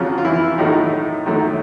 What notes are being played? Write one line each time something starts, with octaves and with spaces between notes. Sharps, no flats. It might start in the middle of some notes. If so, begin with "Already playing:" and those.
Already playing: F2 C#3 F3 F#3 F4
F4
E3 E4
A2 D#3 F#3 A3 D#4
F#2 D#3 F#3 A3